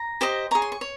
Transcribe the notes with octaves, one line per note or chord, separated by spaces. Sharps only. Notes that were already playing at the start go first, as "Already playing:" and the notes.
Already playing: A#5
G4 C5 D#5
G#4 C#5 A#5
C6
C#6
C#5